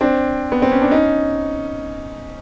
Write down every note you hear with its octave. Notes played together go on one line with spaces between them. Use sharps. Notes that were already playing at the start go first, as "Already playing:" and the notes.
C4 D4
B3
C4
C#4
D4
C#4 D#4